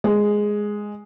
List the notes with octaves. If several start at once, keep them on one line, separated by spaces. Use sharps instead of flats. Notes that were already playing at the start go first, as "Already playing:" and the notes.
G#3